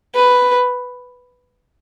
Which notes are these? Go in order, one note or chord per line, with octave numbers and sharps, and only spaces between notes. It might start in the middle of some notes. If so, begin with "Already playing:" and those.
B4